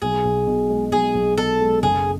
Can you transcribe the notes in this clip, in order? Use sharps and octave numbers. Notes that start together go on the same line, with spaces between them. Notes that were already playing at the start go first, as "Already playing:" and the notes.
B1 G#4
B1
B2
G#3
B1 G#4
B1
B2 A4
G#3
F#1 G#4